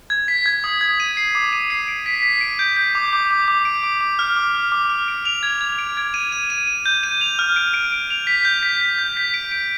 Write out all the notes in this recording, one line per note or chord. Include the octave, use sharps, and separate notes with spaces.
G#6
B6
G#6
D#6
G#6
D#7
C7
D6
D#7
C7
D7
B6
B6
D7
G6
G6
D6
D6
D6
D6
D7
D6
D6
F6
D6
F6
D6
F6
D7
F7
G#6
G#6
D7
G#6
D#7
D#7
D#7
D#7
G6
D#7
F7
F6
D7
D7
D7
F7
B6
G6
B6
B6
G6
B6
D7
D7